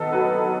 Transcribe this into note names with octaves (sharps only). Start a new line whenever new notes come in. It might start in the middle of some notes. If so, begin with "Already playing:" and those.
Already playing: D#3 B3 A4 D#5
F#3 B4
F#3